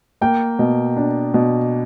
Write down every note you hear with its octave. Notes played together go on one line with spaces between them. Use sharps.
A#3 G5
B2
D4
B2